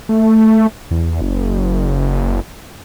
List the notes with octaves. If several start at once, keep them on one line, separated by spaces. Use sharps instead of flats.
A3
E2
F#1